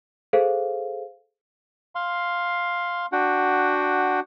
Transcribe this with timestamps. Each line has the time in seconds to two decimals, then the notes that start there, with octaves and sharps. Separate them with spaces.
0.33 G#4 A4 C5 F5
1.95 F5 C6
3.12 D4 F#4 F#5 G5